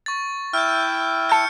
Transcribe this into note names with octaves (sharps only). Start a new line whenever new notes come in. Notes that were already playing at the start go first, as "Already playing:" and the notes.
C#6 A6
E4 E5 G5 F6 G6
A5 F6 G6 A6 C#7